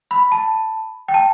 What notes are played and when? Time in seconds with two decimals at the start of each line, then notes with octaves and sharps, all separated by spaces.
0.11 B5
0.32 A5
1.08 G5
1.14 A5